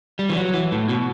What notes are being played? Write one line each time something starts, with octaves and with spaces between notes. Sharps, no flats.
G3
E3
F#3
E3
A2
B2